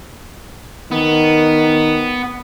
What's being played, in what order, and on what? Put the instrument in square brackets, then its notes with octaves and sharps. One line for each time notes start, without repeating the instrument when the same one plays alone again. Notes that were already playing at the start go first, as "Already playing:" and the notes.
[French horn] D#3 [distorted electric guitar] B3